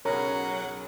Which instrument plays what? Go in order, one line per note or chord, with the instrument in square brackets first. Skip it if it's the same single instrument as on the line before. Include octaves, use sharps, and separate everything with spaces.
[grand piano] B1 C#3 [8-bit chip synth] F#3 F#5 [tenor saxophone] C#4 [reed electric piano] A#4 A#5